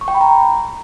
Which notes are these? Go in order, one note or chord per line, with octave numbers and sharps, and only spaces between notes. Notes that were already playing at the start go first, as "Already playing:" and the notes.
C#6
G5
B5
A#5